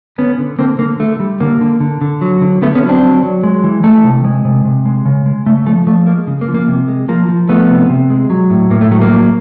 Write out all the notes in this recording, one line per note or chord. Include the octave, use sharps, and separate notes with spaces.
D3 B3 C#4
D3
D3 A#3 C4
D3 A#3
D3 A3
G3
D3 A#3
D3
D3
D3
F#3
D3
D3 A3 B3
B3 C#4
F#3
C4 D4
F#3
F#3
G#3
E3
E3 A3
C3
G#3
C3
C3
G#3
C#3
G#3
C#3 A3
F3 A3
F3 A3
G#3 A#3
C#3
A#3
F3
A#3
C3
G#3
F3 A#3
F3
F3 A3 B3
C3
C3
G#3
F#3
A2
A2 A#3
A3
F#3 A3
A#3
F#3